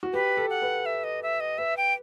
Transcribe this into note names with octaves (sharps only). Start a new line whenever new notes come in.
F#4
G4 B4
A4
F#5
B4
E5
D#5
E5
D#5
B4 E5
G5